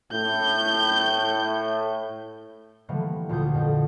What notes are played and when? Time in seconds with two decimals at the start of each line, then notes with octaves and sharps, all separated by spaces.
0.12 A2 G6
2.89 D3 E3 F3 G3 A3 A#3
3.29 D2 A#2 F4 D#6 G6
3.54 F2